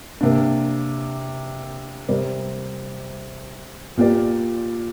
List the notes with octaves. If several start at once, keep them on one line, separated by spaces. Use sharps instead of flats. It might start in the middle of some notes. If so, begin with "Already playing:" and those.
C3 A#3 D4
C3 G3 C4 A#4 D5
A#2 A#3 G4 D5